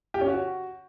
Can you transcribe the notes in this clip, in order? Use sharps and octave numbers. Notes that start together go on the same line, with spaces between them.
G4
C#4
F#4